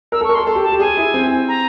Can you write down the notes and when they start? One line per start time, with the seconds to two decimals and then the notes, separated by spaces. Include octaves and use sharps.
0.12 A#4 E6
0.21 A4
0.24 C#6
0.29 A#4
0.35 A4 C6
0.47 A4
0.55 G4
0.63 A5
0.72 G4
0.80 G#4 G#5
0.97 E4
1.14 C4
1.48 A#5